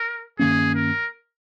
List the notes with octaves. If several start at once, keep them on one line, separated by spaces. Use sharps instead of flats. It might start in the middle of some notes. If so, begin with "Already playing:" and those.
Already playing: A#4
G2 D#3 A#3 C#4 G#4
A#4